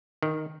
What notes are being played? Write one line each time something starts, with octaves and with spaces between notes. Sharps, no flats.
D#3